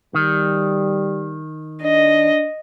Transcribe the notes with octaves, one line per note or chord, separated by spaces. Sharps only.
D#3 G3
D4 D#5